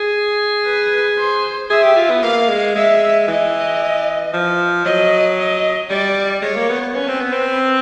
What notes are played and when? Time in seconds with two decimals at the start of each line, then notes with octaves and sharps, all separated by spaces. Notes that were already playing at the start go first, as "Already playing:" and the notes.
Already playing: G#4
0.65 B4
1.18 C5
1.70 G#4 E5
1.84 G4
1.97 F4
2.10 B3
2.23 A#3 F5
2.49 G#3
2.75 G#3 E5
3.28 E3 D#5
4.33 F3
4.85 F#3 D#5
5.38 D#5
5.90 G3 D5
6.42 G#3 C#5
6.56 A#3
6.69 B3
6.82 B3
6.95 C#4 B4
7.08 C4
7.20 B3
7.33 C4